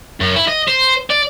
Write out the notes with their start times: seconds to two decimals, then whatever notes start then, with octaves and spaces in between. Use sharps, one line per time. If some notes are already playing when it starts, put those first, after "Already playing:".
0.20 F#2
0.36 E4
0.48 D#5
0.68 C5
1.10 D5